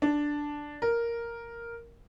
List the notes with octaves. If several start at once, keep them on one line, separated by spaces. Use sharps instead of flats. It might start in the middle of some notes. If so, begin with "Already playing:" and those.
D4
A#4